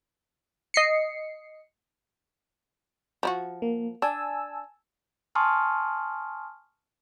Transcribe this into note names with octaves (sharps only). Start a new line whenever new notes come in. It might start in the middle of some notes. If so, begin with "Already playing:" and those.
D#5 C7 C#7
F3 E4 F#4
A#3
D4 G#5 A5 E6
G#5 A5 C6 C#6 D#6 F6